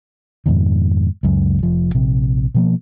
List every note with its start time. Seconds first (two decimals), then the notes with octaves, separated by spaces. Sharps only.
0.46 F2 G#2 B2 D#3
1.23 C#2 F#2
1.59 F1 F3
1.95 A#1 C3
2.55 B2 F3 A#3